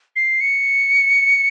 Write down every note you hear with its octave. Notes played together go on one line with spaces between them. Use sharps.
C7
C#7